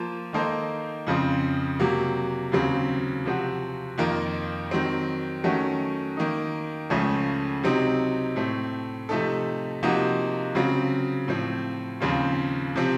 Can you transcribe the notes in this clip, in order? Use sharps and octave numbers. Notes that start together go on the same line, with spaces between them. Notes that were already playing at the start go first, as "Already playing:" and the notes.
Already playing: F3 A#3 F4
D#3 A#3 D#4 A4 C5
F2 C#3 F3 C4
C3 F#3 A#3
D#2 C#3 F#3 C4
C3 F3 C4 F#4
F2 D#3 A#3 F4 A#4
D#3 F#3 C4
D#3 F#3 A3 C#4 F#4
D#3 A#3 D#4
C#2 C#3 F3 A3 C#4
C3 F#3 C4 D#4
A2 A3 C4
C3 F3 A3 D#4 A4
C3 F3 A#3 D#4 F#4
C#3 F#3 C4 F4
A2 F3 C4
D#2 C#3 F3 C4 F4
C3 F3 C4